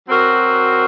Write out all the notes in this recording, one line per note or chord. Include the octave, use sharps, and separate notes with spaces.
F#3 C4 F#4 A#4